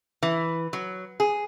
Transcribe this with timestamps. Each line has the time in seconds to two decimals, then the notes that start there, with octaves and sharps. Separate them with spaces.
0.23 E3
0.73 F#3
1.20 G#4